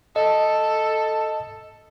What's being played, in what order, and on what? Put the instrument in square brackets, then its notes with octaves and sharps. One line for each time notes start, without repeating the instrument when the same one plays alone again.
[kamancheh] A4 [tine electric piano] D#5